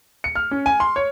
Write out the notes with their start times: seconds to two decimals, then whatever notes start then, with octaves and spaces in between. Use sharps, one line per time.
0.24 C#7
0.35 F6
0.51 C#4
0.66 G#5
0.80 C6
0.96 C#5